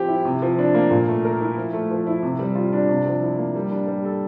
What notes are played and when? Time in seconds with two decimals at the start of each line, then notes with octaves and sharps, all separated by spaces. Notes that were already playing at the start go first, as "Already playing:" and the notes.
Already playing: F3 C4 G4
0.08 E4
0.25 C3
0.42 F3
0.59 D4
0.74 A#3
0.91 A#2
1.08 A3
1.25 A#4
1.41 E4
1.57 F3
1.73 A3
1.91 F3
2.07 E4
2.23 C3
2.39 G3
2.55 F4
2.73 D4
2.89 C3
3.06 F3
3.22 E4
3.38 A#3
3.55 G3
3.71 D4
3.87 G3
4.05 A4